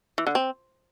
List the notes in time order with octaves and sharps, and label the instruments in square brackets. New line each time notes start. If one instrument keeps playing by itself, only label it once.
[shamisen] E3
D3
C4